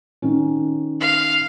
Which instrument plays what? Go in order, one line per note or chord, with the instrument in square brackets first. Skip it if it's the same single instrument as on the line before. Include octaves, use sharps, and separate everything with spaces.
[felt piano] D#3 C#4
[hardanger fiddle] F5